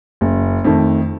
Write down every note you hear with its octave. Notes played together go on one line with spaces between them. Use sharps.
F#1
F2 D#3 A3